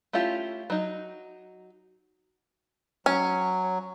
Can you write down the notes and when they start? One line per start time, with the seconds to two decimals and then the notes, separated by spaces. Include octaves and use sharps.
0.13 A3 C#4 E4 F4 G4
0.70 F#3 D#4
3.06 F#3 C#4